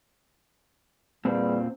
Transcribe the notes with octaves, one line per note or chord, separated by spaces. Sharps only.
E2 A#2 G3 A#3 C4